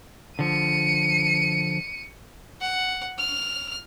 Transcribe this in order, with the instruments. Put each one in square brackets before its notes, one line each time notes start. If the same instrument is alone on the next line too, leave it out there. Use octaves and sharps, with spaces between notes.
[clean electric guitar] D3 F3 [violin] C#7 D#7
[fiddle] F#5
F6